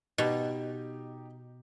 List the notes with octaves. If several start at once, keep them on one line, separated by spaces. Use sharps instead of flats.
B2 D#4 G4